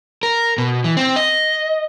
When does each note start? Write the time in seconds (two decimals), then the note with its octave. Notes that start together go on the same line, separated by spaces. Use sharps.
0.23 A#4
0.58 B2
0.84 E3
0.97 C4
1.16 D#5